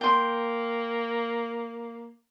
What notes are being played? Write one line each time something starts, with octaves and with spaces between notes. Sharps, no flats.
A#3 G5 C6